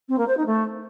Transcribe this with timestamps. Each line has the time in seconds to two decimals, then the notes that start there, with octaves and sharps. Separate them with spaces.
0.08 C4
0.18 A#3
0.27 C5
0.37 D#4
0.46 A3